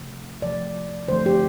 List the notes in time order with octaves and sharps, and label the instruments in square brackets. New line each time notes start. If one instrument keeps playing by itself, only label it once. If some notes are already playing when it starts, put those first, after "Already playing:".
Already playing: [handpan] C3 F3 A3
C3 F3 A3 D5
D3 F3 A3 C5
G4